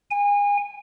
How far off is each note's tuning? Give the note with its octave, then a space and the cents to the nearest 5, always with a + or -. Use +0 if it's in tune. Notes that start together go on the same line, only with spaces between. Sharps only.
G#5 -30